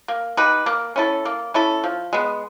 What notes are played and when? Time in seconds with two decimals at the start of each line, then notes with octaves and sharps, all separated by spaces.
0.08 A#3
0.37 D#4 G4 B4
0.66 A#3
0.96 C#4 E4 A4
1.25 A#3
1.54 C#4 E4 A4
1.84 F3
2.13 G#3 B3